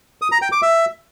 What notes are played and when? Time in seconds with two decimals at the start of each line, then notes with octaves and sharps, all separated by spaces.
0.22 D#6
0.32 A#5
0.42 G5
0.52 D6
0.62 E5